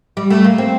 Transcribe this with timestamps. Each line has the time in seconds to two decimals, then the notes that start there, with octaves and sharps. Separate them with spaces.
0.17 G3
0.30 A3
0.44 A#3
0.58 C4